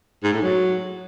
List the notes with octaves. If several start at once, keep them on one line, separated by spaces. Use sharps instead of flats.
G#2
A2
F#3